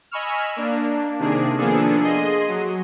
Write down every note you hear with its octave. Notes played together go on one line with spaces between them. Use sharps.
D#5 G#5 B5 C#6 E6 F6
A#3 D4
C3 D#3 A#3 D4 G#4
F3 A#3 B3 D4 G#4 A4
G#4 D#5 C6 D#7
F#3